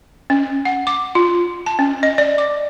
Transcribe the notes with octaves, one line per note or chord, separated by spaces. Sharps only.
C#4
F#5
D6
F4
A5
C#4
D#5
D5
D6